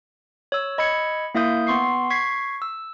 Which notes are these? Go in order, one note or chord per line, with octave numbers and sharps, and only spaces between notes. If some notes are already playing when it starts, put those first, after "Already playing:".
C#5 E6
D#5 B5 E6 G#6 C#7
A#3 E4 E5 F5 D#6 G6
B3 C6 C#6 C7
C#6 G#6 B6 C7
E6